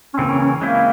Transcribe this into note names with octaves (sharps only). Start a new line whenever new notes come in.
C#4
C#3 E3 A#3 C4
C#4
C#4
G#3 A#3 C4 E4